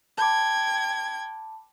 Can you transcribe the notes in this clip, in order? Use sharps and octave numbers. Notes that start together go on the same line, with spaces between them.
G5 A5 B5 D6 G#6